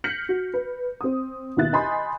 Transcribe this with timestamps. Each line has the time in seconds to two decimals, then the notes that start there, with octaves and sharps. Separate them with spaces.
0.04 F6 G6 A#6 B6 C#7 F#7
0.29 F#4
0.54 B4
1.01 C4 D#6
1.57 D#2 B2 E4 E5 F#6 A6
1.73 D#5 G#5 B5 C6 D#6 G6